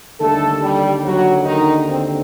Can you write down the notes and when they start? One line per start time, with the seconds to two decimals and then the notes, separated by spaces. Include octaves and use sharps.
0.20 D#2 D3 G3 A3 A4
0.62 G3 G4
1.04 F#3 F#4
1.46 D#3 D#4
1.89 C4